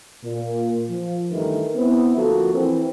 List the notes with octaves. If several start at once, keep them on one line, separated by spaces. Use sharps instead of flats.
A#2
F3
G2 D#3 E3 A3 A#4
B3 C4 E4
D2 F3 A#3 F#4 A4 A#4
E3 C4